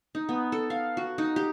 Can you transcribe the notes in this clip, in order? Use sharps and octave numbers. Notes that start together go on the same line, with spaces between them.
D#4
B3
A4
F5
F#4
D#4
G4